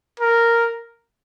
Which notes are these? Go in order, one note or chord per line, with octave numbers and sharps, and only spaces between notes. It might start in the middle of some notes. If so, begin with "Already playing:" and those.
A#4